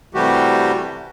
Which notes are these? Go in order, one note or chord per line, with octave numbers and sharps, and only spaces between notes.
C3 E3 G3 A3 F#4 G4